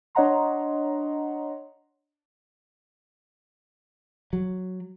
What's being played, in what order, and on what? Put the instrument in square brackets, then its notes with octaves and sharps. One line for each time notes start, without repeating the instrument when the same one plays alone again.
[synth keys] D4 C#5 D#5 F#5 A#5 C6
[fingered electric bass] F#3